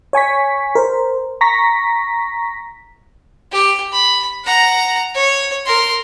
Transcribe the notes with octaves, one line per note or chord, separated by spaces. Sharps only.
C#5 G#5 C#6 B6
A#4 C5
A#5 C#6 A#6 B6
G4
B5
F#5 A#5
C#5
A#4 C6